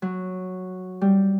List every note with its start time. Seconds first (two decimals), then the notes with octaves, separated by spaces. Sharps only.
0.02 F#3
1.01 G3